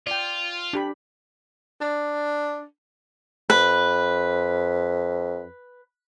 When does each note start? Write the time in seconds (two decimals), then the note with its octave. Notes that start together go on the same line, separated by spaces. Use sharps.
0.07 F4 D5 G5
0.73 D4 G4 B5
1.81 D4
3.50 F2 B4